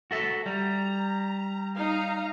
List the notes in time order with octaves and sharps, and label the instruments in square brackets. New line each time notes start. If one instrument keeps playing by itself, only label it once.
[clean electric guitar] F#4 A4 E5
[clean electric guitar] G3 [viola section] A#5
[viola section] D#4 F5 A#5